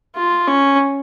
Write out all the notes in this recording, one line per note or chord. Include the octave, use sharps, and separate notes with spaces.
F4
C#4